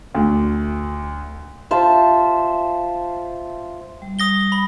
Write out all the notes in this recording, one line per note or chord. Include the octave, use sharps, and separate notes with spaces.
D2
F4 C5 E5 A5
G3
D#6 A#6 G7
B5